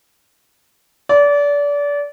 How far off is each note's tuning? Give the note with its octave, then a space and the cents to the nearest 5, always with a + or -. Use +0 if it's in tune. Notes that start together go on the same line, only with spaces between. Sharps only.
D5 -30